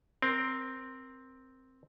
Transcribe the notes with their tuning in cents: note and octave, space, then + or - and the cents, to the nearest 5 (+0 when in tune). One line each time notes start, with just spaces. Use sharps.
C4 +0 A#4 +15